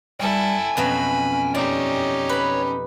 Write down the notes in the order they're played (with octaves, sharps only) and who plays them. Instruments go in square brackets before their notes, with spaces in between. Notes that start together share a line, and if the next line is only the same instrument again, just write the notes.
[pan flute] G3 [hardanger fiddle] E4 A4 [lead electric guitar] G5 G#5
[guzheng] F2 B2 F#3 [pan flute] C#4 [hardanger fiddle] B5
[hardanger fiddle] D#4 G4 [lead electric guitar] C#5 G5 [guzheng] D5
[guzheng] B4 B5